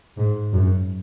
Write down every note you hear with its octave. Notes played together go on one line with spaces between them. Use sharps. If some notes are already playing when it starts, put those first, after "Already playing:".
G#2
F#2